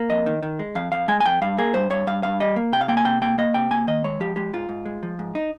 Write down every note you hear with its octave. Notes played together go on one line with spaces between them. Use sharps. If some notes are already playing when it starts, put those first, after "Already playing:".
Already playing: A#3
F2 D#5
D#3
D#3
G#3
F2 F5
F2 F5
G#3 G#5
G#5
F2 G5
G2 F5
A#3 G#4
G2 C5
G2 C#5
G2 F5
G2 F5
G3 D#5
A#3
C3 G5
F5
A#3 G5
G#5
C3 G5
A#3 G5
A#3 D#5
C3 G5
A#3 G#5
D#3 D#5
G#3 C#5
F3 G4
G#3 G4
G#2 F4
G#2
G#3
F3
G#2
D#4